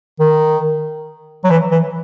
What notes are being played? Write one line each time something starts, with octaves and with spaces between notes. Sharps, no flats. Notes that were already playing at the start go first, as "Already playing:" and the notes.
D#3
F#3
E3
E3